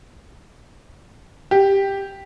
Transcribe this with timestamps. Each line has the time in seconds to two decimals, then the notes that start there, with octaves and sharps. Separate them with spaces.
1.51 G4